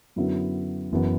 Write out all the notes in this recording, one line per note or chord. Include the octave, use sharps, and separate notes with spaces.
F#2 D3 F#3 B3 E4
F#1 F#2 E3 B3